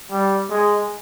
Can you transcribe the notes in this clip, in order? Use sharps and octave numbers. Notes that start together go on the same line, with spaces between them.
G3
G#3